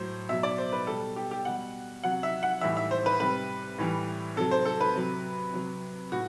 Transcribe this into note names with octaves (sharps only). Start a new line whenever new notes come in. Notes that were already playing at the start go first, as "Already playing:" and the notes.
Already playing: A2 F#3 C5
B2 F#3 E5
D5
C5
B4
B2 G3 A4
G4
G4
B2 G3 F#5
C3 F#3 F#5
E5
F#5
A2 E3 G3 E5
E5
C5
B4
C3 G3 B4
A2 E3 G3
C3 F#3 A4
C5
A4
B4
C3 F#3
C3 F#3
A2 F#4